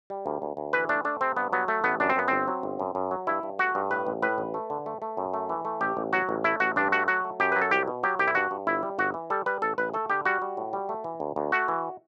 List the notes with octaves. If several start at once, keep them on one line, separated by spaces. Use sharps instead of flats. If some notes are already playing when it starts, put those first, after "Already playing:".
G3
D2
D2
D2
E3 B4
A3 D4
A3 D4
C3 C4
G2 B3
F#3 B3
A3
A1 B3
F#2 D4
C4
F#2 B3
G1 C4
F#3
G1
F#2
F#2
F#3
G2 E4
G2
A3 F#4
G2
A2 B4
A1
A2 B4
A1
A3
D3
A3
A3
F#2
A3
E3
A3
A1 G4
A1
F#3 F#4
A1
A3 E4
A1 F#4
G2 D4
A3 F#4
F#3 F#4
A3
F#2 G4
F#3 B4
A4
C2 G4
B2
F#3 G4
C2 G4
E4
G2 F#4
G2
G1 E4
G3
G1 F#4
E3
G3 A4
G3 B4
A1 A4
A1 B4
A3 A4
D3 G4
G3 F#4
G3
A2
G3
A3
E3
D2
D2
A3 F#4
E3